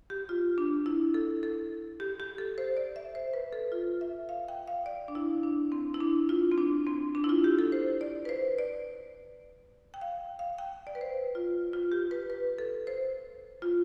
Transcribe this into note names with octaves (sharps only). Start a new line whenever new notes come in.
G4
F4
D4
E4
A4
A4
G4
G4
A4
C5
D5
E5
C5
B4
A4
F4
E5
F5
G5
F5
D5
D4
E4
D4
C4
E4
D4
F4
C4
D4
C4
D4
E4
F4
G4
A4
C5
D5
B4
C5
D5
G5
F5
F5
G5
D5
B4
C5
F4
F4
G4
B4
B4
A4
C5
F4